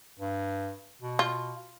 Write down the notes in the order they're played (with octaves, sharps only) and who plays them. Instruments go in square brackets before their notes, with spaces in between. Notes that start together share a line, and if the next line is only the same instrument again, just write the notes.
[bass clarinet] G2
B2
[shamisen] F4